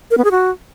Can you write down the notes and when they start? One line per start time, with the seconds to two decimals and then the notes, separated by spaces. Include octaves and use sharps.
0.11 A#4
0.18 B3
0.24 G#4
0.31 F#4